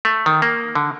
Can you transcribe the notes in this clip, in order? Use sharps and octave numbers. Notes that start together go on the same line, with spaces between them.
A3
D#3
A#3
D3